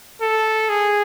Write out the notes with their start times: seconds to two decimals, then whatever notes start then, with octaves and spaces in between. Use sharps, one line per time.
0.21 A4
0.69 G#4